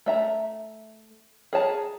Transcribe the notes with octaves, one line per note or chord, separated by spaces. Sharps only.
A3 E5 A#5
G#4 C#5 A5 A#5